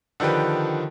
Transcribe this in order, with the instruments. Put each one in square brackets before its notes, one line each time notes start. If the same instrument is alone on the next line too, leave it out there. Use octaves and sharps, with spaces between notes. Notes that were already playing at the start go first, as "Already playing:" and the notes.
[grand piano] D3 D#3 F3 G4 B4